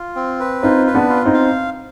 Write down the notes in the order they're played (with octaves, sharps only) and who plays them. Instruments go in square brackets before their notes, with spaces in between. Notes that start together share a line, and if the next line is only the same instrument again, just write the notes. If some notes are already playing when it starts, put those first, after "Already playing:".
Already playing: [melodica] F4
C4
B4
[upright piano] C4 D#4 [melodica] F4
[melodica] B4
[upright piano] B3 D4
[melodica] F4
[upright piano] C4 D#4
[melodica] F5